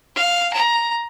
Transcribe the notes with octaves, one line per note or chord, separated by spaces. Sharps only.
F5
A#5